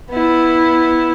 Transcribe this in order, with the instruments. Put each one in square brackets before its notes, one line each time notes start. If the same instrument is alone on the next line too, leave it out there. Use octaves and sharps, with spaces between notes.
[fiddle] B3 E4